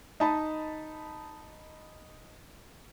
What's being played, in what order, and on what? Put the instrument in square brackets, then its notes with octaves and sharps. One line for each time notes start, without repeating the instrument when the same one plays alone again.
[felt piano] D#4 D#5 A5 B5